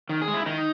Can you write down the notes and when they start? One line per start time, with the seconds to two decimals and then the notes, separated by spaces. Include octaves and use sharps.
0.09 D#3
0.22 G#4
0.28 G#3
0.34 E4
0.46 D#3 D#4